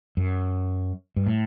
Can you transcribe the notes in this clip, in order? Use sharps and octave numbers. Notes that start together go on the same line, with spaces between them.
F#2
G2
A2